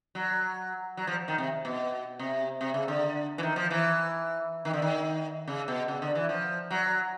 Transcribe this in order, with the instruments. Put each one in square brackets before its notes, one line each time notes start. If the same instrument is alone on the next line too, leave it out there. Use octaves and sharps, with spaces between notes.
[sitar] F#3
F#3
F3
D#3
C3
B2
C3
C3
C#3
D3
E3
D#3
F3
E3
D#3
D3
D#3
C#3
B2
C#3
D3
E3
F3
F#3